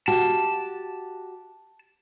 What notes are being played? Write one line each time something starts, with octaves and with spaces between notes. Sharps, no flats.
F#4 G4 A5